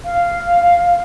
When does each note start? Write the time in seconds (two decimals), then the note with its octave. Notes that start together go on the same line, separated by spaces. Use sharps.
0.05 F5